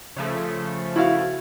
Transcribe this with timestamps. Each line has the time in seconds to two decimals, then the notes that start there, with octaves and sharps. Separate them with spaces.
0.16 C#3 F3 A3
0.96 E4 F#4 F5